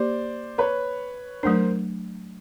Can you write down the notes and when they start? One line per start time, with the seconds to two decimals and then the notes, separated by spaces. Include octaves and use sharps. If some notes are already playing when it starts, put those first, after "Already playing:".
Already playing: A#3 G4 C5 D5
0.58 B4 C#5
1.43 F#3 A3 D4 A#4 C5